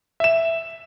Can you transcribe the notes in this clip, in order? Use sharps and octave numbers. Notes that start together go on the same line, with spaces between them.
E5 E7